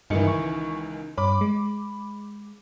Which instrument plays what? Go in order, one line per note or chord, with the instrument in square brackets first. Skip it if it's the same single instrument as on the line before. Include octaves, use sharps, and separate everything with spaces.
[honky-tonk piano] C#2 D#3 E3 [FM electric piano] G2 D#4 C#7
[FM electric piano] C#6
[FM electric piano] G2 C#5 [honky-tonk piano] B5 D6
[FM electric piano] G#3